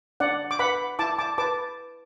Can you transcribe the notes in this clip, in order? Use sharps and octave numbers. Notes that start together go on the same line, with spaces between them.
D4 D5 F#5
D6
B4 F#5 B5
E4 A5 D6
A5 D6
B4 A5 D6